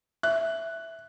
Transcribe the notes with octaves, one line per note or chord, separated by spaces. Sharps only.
E5 F#6